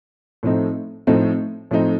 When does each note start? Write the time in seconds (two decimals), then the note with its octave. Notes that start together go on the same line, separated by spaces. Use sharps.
0.43 A2 F3 A3 C4 D#4
1.07 A2 F3 A3 C4 D#4
1.71 A2 F3 A3 C4 D#4